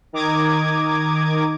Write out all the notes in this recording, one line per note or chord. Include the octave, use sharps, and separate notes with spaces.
D#3 A#5 D6 D#6 G#6